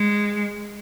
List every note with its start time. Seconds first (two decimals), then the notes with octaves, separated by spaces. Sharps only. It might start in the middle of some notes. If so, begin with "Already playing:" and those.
Already playing: G#3